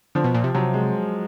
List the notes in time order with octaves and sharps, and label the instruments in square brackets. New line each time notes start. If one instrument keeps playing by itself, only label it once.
[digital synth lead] D3 [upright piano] F3
[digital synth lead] B2
A#2
C3
[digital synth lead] C3 [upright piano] F#3
[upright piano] G#3